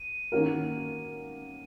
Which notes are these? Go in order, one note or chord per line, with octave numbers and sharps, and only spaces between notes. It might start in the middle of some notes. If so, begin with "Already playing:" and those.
Already playing: D#7
D#3 A#3 C#4 F#4 A#4